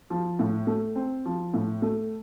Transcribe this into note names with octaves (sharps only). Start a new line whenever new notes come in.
F3
A2
A3
C4
F3
A2
A3